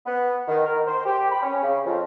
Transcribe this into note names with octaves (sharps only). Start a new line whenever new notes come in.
B3
D#3
A#4
C5
G4
B5
C#4
C#3
F2